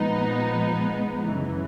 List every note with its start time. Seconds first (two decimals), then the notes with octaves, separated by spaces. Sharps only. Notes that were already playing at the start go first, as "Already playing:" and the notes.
Already playing: A#2 F3 G#3 B3 D#4
1.31 G1 F#2 C#3 E3